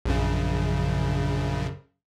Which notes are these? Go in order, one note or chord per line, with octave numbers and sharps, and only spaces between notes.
A#1 F#2 C#3